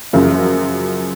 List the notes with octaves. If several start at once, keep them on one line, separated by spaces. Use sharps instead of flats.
F#2 C#3 F3